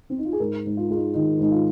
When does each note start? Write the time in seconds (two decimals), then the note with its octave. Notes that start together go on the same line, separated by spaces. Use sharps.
0.10 C4
0.18 D#4
0.25 F4
0.33 G#4
0.40 G#2 A#4
0.66 G#2
0.77 F4
0.89 G#3 F4
0.96 D#4
1.14 D#3 D#4
1.39 G#2 D#4
1.52 F4